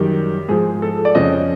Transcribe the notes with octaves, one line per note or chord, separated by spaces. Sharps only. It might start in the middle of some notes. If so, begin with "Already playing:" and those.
Already playing: F#2 D#3 G3 G4
G#2 F3 G#4
A4
D5
F2 C#3 F3 D#5